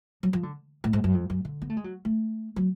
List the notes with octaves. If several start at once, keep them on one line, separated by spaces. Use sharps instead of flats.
F#3
F3
D3
A2
G#2
F#2
F2
F#2
D3
B3
A3
G#3
F#3
A3
F#3